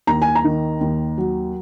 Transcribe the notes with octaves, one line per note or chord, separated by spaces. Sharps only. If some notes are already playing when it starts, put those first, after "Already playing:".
D#2 A#5
G#5
A#5
D#3
D#2
F#3